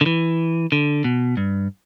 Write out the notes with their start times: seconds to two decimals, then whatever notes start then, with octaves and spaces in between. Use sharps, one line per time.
0.01 D3
0.06 E3
0.72 D3
1.04 B2
1.37 G2